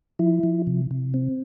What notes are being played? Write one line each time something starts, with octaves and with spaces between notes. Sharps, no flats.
F3 E4
F3
C3
C3
C4